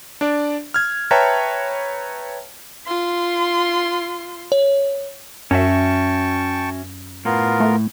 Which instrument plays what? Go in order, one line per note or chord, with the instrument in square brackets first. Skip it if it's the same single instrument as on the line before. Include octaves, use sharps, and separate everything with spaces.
[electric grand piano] D4 D5
F6 G#6
B4 C#5 E5 G5 A5 A#5
[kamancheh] F4 C6
[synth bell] C#5
[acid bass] F#2 [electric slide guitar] C#4 F#4 E5 [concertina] G5 A5 C#6
[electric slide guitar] A2 [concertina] B3 F4 A#4
[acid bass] A3